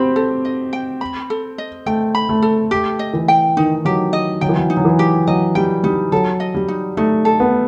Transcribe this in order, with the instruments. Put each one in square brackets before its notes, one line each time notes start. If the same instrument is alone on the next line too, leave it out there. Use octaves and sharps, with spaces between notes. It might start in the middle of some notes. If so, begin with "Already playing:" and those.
Already playing: [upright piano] C4 F#4 G4 [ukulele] B5
[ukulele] A4
D#5
G5
B5
A4
D#5
[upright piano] A3 [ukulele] G5
[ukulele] B5
[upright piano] A3
[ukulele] A4
[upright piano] A3 [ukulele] G4
[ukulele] D#5
[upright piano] E3
[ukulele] G5
[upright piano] D#3 [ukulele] D#4
[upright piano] F#3 [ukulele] G4
[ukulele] D#5
[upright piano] F#3 [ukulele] G5
[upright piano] E3
F#3
[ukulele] D#4
[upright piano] F#3
E3
[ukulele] G4
[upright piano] F#3 [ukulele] D#5
[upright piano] G3 [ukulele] G5
[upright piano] G3 [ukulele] D#4
[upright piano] F#3 [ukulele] A4
[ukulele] D#5
[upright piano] G3
[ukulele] D#4
[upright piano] A3 [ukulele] D#4
[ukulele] A4
[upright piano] B3